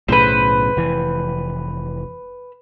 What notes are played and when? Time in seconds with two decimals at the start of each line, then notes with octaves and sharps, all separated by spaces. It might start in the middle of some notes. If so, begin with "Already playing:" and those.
0.08 B1 A2 C#3 B4 C5
0.77 F1 E3